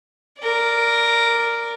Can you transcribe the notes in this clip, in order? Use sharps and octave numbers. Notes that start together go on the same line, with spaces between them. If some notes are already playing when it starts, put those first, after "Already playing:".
A#4 D5